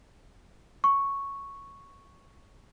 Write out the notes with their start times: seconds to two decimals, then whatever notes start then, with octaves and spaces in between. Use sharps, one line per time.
0.84 C#6